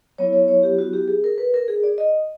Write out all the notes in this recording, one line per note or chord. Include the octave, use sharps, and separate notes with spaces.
F#3 B3 E4 C#5
C#5
C#5
G4
F#4
G4
G#4
A#4
B4
A#4
G#4
D5
D#5